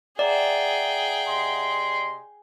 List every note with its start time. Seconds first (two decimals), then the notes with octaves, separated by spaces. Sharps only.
0.19 G#4 D5 E5 F#5 G5 A#5
1.27 C3 D#5 C6